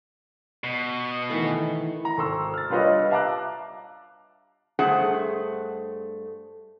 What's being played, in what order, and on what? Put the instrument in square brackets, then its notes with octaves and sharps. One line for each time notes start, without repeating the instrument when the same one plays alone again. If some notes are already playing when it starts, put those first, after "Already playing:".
[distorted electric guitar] B2
[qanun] D#3 E3 A3
[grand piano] A#5
G#1 A4 C6 C#6 E6
F6 A6
G3 D4 F4 B4 C#5 D#5
E5 F5 A5 A#5 D6 F#6
[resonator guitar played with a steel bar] G2 A3 G#4 C5 F#5